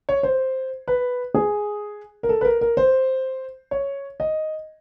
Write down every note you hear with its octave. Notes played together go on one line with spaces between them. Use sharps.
C#5
C5
B4
G#4
A#4
A4
B4
A#4
A#4
C5
C#5
D#5